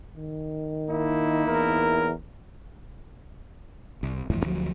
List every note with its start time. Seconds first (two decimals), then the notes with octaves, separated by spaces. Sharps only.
0.17 D#3
0.89 A#3 D#4 E4
1.47 E2 A#4
4.03 C2
4.30 G1 F2 A2 E3
4.45 D2 F3 F#3